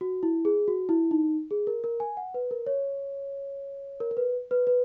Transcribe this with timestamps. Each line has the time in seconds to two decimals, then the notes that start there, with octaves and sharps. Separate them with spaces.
0.01 F#4
0.23 E4
0.45 G#4
0.68 F#4
0.89 E4
1.11 D#4
1.51 G#4
1.67 A#4
1.84 A#4
2.00 G#5
2.17 F#5
2.34 B4
2.51 A#4
2.67 C#5
4.00 A#4
4.11 A#4
4.17 B4
4.51 B4
4.67 B4